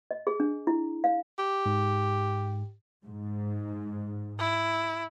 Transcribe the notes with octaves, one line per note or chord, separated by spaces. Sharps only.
D#5
G#4
D4
E4
F5
G4
G#2
G#2
E4